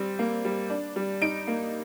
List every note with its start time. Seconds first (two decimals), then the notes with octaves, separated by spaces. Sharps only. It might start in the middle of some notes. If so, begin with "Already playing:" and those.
Already playing: G3 C4
0.19 A#3
0.45 G3
0.70 D4
0.96 G3
1.22 D#4 D7
1.48 A#3